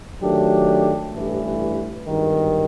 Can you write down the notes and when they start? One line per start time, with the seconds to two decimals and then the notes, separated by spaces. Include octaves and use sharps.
0.21 D#3 F#3 A3 D4 G4
1.13 A1 G2 E3
2.07 G#1 G2 D#3